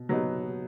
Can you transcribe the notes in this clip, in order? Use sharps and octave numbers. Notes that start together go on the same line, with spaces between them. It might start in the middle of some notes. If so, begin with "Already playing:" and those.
Already playing: B2
F#3 B3 D#4